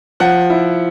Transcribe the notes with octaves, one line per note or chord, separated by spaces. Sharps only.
F3 F#5
E4